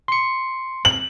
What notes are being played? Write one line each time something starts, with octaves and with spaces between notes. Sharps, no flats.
C6 C#7
F#7